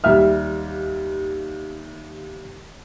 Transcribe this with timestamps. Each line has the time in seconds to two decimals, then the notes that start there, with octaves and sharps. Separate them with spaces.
0.04 D#2 G3 E5 F6